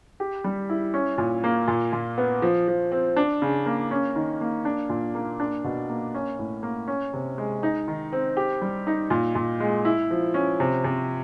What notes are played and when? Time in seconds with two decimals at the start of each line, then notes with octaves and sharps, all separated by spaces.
0.20 G4
0.44 G3
0.69 E4
0.94 C#4
1.18 A#2
1.44 A#3
1.68 A#2
1.93 A#2
2.18 B3
2.42 F3
2.68 F3
2.92 C4
3.17 D4
3.42 C#3
3.66 A#3
3.91 C#4
4.16 D#3
4.41 A#3
4.65 D4
4.89 A#2
5.15 A#3
5.40 D4
5.64 B2
5.90 A#3
6.14 C#4
6.39 A2
6.63 A#3
6.88 C#4
7.13 C3
7.38 G#3
7.63 D#4
7.88 D#3
8.13 C4
8.37 G4
8.62 G3
8.87 D#4
9.10 A#2
9.35 A#2
9.60 G#3
9.85 E4
10.11 F3
10.34 C#4
10.60 C3
10.84 C3